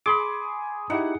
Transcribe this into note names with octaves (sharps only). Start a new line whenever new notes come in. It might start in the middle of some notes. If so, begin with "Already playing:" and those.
G#4 B5 C6 D6
D#4 E4 G4 F#5